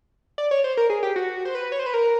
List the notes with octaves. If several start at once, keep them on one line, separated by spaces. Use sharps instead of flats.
D5
C#5
C5
A#4
G#4
G4
F#4
C5
B4
C#5
C5
B4
A#4